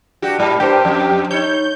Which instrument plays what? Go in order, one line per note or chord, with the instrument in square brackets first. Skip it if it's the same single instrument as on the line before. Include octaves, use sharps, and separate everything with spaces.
[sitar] G2 F#4 G4
G#2 G3
[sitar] G2 A#4 C5 [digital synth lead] G4
[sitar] F2
[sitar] D#4 C#5 [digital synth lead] G6